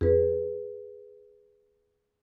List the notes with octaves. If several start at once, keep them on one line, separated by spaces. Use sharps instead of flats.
F2 G#4 B4